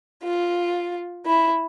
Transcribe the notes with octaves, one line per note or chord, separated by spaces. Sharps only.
F4
E4